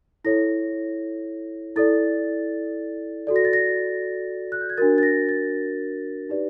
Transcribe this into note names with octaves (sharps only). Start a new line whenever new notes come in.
E4 A4 C#5 A#6
E4 A4 D5 A6
F#4 A4 D5
A#6
A6
A#6
F#6
G6
G#6
D4 F#4 A#4 A6
A6
A#6
A6
D#4 G4 B4 D5